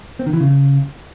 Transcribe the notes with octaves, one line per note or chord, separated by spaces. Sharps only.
C4
D#3
E3
C#3